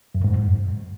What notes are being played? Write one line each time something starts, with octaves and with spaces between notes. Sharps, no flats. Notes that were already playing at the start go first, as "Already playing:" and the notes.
F#2
G#2
F#2